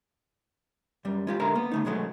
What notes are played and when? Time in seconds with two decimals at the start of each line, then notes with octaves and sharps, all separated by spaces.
1.05 F#2 G3
1.27 G#3 F4 G4
1.40 B1 D3 G#3 A#4 E5 A#5
1.55 A#3 B3
1.72 D3 A3 D#4
1.85 B2 F#3 G#3 A3